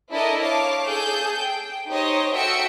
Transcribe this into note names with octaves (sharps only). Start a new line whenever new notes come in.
D4 E4 A4 A#4 D5 D#5
C#5 F5 A5 D6
G#4 A4 G6
G5
D#4 G4 C5 C#5 D#5
F#4 A4 E5 G5 E6 C#7